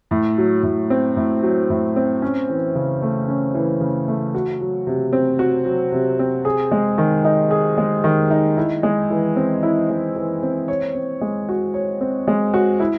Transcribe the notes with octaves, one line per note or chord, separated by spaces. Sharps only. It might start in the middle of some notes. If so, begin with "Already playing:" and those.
A2
F#3
A2
C4
A2
F#3
A2
C4
C#4
E3
C#3
A3
C#4
E3
C#3
A3
F#4
F#3
C3
C4
F#4
F#3
C3
C4
G#4
G#3
D#3
D#4
G#4
G#3
D#3
D#4
E4
G#3
E3
C4
E4
G#3
E3
C4
C#5
C4
G#3
F#4
C#5
C4
G#3
F#4
E4